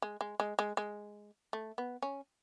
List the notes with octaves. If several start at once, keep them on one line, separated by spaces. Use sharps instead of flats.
G#3
G#3
G#3
G#3
G#3
A3
B3
C#4